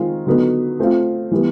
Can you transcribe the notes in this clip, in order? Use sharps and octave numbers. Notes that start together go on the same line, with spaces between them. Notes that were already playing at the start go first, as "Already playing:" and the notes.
Already playing: D#3 G#3 C4 F4
D3 F#3 B3 D#4
A3 C4 F4
E3 G3 B3